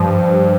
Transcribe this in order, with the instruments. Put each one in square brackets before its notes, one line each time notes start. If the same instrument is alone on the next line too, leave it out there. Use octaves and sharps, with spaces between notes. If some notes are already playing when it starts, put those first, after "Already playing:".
Already playing: [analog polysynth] G2 [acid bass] F3